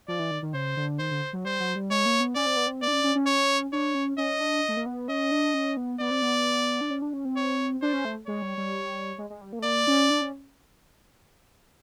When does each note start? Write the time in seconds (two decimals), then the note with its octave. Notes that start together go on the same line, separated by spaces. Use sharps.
0.08 F3 D5
0.19 E3
0.31 D#3
0.42 D#3
0.54 C#3 C5
0.77 D3
0.99 D#3 C5
1.11 D3
1.33 F#3
1.45 G3 C5
1.60 F#3
1.76 G3
1.91 G#3 C#5
2.06 A#3
2.20 B3
2.35 C#4 D5
2.46 C4
2.57 B3
2.67 C4
2.82 B3 D5
2.88 D4
2.93 C#4
3.04 C#4
3.15 C#4
3.27 C#5
3.73 D4 C#5
3.95 C#4
4.18 C#4 D#5
4.40 D4
4.69 A3
4.77 A#3
4.86 B3
5.08 C#4 D#5
5.31 D4
5.54 C#4
5.77 B3
6.00 B3 D5
6.11 C4
6.22 B3
6.81 D4
6.90 C#4
7.02 D4
7.13 C#4
7.25 C4
7.36 C#5
7.82 D4 C5
7.93 C#4
8.05 A3
8.27 G#3 C#5
8.42 G3
8.58 G3
9.18 G#3
9.30 G#3
9.41 G3
9.53 A#3
9.59 A3
9.64 A#3 D5
9.87 C#4
10.10 D4
10.21 C#4